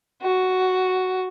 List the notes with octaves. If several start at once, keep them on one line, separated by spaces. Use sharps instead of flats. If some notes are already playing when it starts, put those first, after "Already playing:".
F#4